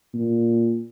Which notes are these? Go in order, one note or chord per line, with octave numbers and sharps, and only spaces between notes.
A#2